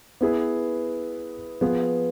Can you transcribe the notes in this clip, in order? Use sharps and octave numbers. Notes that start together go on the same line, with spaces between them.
B3 E4 G#4 B4
F3 B3 F4 G#4